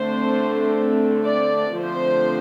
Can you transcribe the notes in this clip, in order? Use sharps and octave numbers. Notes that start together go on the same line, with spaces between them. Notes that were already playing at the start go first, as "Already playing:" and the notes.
Already playing: D3 A3 C4 C5
D5
D3 F3 A3 C4 C5